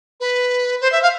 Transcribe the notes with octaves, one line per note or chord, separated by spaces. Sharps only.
B4
C5
E5
F5